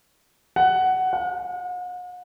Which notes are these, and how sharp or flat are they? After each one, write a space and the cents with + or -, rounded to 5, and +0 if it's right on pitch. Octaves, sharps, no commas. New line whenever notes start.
F#5 +10
F#5 -45